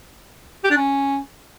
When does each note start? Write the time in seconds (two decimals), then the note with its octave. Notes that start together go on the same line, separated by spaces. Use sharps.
0.64 G4
0.71 D4
0.77 C#4